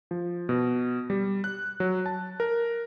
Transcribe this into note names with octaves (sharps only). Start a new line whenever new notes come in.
F3
B2
G3
F#6
F#3
A5
A#4